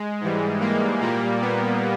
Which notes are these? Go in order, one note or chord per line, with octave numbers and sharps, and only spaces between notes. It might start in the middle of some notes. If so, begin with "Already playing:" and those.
Already playing: G#3
G#2 E3 G3
A#3
A#2 G3 A#3
B3